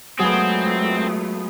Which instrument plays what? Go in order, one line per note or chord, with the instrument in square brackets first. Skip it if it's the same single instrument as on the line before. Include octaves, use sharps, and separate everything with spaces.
[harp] F#3 [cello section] G#3 A3 F4 [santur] B3 G#4 [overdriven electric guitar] C4